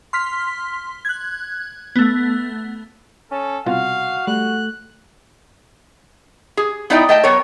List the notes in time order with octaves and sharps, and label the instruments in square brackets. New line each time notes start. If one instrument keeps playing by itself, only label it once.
[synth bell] C6 F6 B6
F#6 G#6
A3 B3
[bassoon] C#4 [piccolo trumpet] A4
[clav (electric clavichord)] C2 B2 F4 [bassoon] F#4 [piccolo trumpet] F5
[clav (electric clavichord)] G3 [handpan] A3 [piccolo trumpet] F#6
[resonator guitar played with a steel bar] G#4
B3 D#4 E4 D5 D#5 G5
A3 D#5 G5 A5
F#3 B3 A#4 C#5